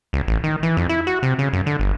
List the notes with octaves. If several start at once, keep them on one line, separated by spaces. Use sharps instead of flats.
C#2
A1
D#3
E3
F2
E4
F#4
C3
C#3
F#2
D3
G1